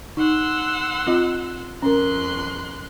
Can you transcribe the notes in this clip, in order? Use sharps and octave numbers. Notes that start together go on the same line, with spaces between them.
D#4 F#5 C6 E6
C4 F4 D#5
F2 C#4 A#4 C6 F#6